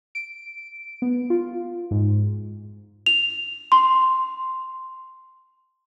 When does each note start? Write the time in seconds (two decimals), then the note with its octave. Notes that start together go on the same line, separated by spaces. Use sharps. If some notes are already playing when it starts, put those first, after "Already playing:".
0.15 D7
1.02 B3
1.30 F4
1.91 G#2
3.06 F7
3.72 C6